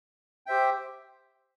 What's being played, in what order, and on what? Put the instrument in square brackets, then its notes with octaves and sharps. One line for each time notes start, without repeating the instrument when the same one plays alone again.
[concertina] G4 C5 E5 G5